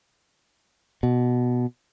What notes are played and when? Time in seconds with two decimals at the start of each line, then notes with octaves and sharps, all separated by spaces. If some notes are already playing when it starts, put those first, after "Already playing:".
1.03 B2